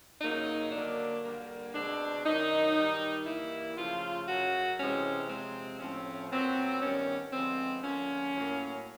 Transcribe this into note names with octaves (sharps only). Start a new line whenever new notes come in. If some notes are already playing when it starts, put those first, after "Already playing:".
F#2 C#3 F#3 A#3 D#4
D3 F#3 A#3 D4
D3 G3 A#3
B2 G#3 C4 D4
F#2 D#3 F#3 D#4
G2 D#3 G3
G2 E3 G3 A#3 E4
C#3 F3 A3 F4
F#2 C#3 F#3 F#4
C3 E3 G#3 C4 C#4
C3 F3 G#3 C4
A2 F3 A3 C4 C#4
A#2 F#3 B3 C4
G2 D#3 G3 B3 C#4
D3 F3 G#3 B3 C4
D3 F3 A#3 C#4
A2 F#3 A#3